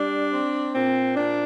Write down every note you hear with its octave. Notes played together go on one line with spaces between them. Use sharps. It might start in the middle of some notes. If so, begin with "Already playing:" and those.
Already playing: G3 D4
C4
A#2 C4
A#2 D4